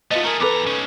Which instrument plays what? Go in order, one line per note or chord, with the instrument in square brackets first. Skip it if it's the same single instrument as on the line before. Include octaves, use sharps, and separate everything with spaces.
[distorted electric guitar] A3 B3 [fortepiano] F4 D#5
[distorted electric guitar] A3 G#4 [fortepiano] A#4
[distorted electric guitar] E2 A#5 [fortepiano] A4 B4 D6
[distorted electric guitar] C#4 D#4